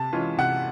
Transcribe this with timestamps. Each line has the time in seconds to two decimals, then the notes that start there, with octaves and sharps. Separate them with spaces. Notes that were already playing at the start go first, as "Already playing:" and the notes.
Already playing: C3 A5
0.13 E3 G#3 C#4 F4
0.38 C3 F#5